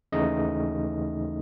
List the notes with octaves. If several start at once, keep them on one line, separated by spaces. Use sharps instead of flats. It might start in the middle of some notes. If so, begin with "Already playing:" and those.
D#2 C#3 E3 A3 D#4 D#5